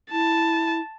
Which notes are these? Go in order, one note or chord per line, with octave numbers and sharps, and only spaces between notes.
E4 A5